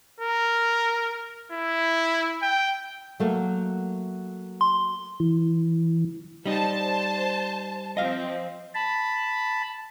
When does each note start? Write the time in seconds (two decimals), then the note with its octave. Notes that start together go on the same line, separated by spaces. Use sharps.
0.20 A#4
1.52 E4
2.42 G5
3.20 F#3 A3 A#3
4.61 C6
5.20 E3
6.46 G3 D#4 C5 A5
7.97 F3 C4 D#5 F5
8.75 A5 B5